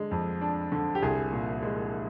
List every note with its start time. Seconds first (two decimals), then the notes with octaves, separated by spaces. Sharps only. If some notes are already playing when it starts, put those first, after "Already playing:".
Already playing: D3 G#3
0.11 F2
0.41 D4
0.72 D3
0.95 G4
1.02 C2 G#4
1.33 A#2
1.63 G#3